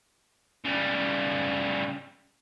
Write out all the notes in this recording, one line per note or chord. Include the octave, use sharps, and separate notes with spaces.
C#3 G3